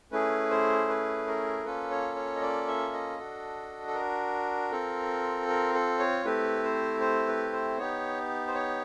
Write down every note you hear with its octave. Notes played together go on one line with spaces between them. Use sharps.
A3 C#4 E4 G#4 B4
C5
B4
A#4
A#3 C#4 F4 A4 B4
C#5
C#5
D#5
D5
E5
D#5
D4 F#4 A4
A4
A#4
C4 F4 A4
A#4
A4
C#5
A3 C4 E4 G4 B4
C5
C5
B4
C5
B3 D#4 G4 C#5
C5
C#5